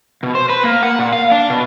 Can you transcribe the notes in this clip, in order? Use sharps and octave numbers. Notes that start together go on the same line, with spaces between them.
B2
C5
B4
A#3
F#5
A#2
F5
D4
B2